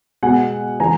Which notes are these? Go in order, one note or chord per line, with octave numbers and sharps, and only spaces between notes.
B2 G#3 F#5 G#5
C#3 E3 G#3 G#5 A#5